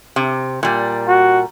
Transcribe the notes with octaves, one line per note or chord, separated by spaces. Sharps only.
C3
A#2 G3
F#4